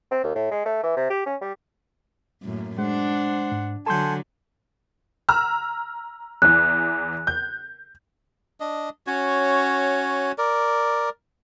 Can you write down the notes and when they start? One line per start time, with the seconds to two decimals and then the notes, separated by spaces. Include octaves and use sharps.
0.11 C4
0.24 D#2
0.35 A2
0.51 G#3
0.66 A3
0.83 E3
0.96 C3
1.10 G4
1.26 C#4
1.41 G3
2.42 F#2 A2 A#3
2.78 G#3 D4 C5 F#5
3.52 G#2
3.86 D3 F#3 A4 F#5 G#5 A5 C6 G6
5.29 A#5 E6 F6
6.42 E2 E3 F#6
7.27 G6
8.60 D4 D#5
9.07 C#4 F#4 C#5
10.38 A#4 D5